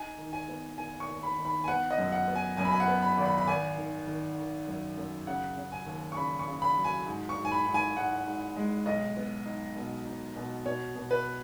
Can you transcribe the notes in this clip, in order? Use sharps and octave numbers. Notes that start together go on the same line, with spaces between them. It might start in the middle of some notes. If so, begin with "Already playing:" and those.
Already playing: D#4 G#5
D#3
G#5
B3
D#3 G#5
C#6
D#2
B5
D#3
B5
G#5
B3 F#5
D#5
F#2
F#5
B3
G#5
F#2 G#5
B5
G#5
F#5
B3
B5
G#1
B5
B5
G#1 G#5
D#3
D#3
D#3
F#2
F#2
C#3 F#5
C#3
G#5
D#2
C#6
C#3 B5
C#6
C#3
B5
F#3
G#5
G#2
C#6
G#2
G#5
B5
G#2
G#5
G#2 F#5
G#2
G#3
B1 D#5
B3
D#4
B2
D#4
B2
B2 C#5
B2
B4